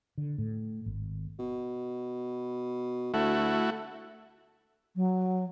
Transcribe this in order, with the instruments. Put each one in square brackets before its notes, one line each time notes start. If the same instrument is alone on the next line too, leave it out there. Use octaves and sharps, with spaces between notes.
[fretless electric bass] D3
A2
G#1
[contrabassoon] B2
[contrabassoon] D2 [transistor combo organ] A3 E4 F#4
[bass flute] F#3